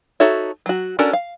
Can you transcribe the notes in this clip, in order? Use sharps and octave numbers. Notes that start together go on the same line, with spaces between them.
D#4 F#4 A4 C#5 E5
F#3 F#4
C#4 D4 F#4 A4 A#4
F5